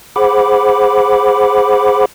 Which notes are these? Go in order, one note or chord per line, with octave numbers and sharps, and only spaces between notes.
G#4 C5 F#5 B5 D6